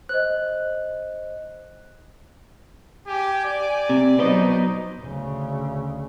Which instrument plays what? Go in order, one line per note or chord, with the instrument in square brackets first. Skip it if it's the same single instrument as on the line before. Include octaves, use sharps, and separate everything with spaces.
[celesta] C5 D#5 [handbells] F#6
[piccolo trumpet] G4 [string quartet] G#5 D6
[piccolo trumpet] D5
[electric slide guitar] C3
[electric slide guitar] B2 B4 D#5 [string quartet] F#3 D#4 C5
[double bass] D2 C#3